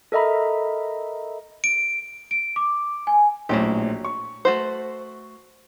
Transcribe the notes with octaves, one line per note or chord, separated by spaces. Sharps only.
A4 A#4 D#5 E5 A#5 B5
D7
D7
D6
G#5
A#1 A2 F#3 C#4 G4
C#6
A3 F#4 C5